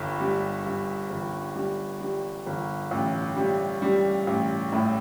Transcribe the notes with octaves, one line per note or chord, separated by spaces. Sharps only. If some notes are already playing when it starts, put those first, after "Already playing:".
Already playing: G1 G2
G3
G2
G1
G3
G3
G1
A1
G3
G3
A1
A2